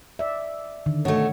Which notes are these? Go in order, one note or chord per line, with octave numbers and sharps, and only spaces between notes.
D5 E5
D3 D#3
B2 A3 C#5